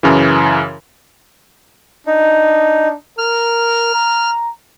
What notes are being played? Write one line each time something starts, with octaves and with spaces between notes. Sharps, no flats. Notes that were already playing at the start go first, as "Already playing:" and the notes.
F#2 C#3 E3
D4 D#4
A#4 F6
A#5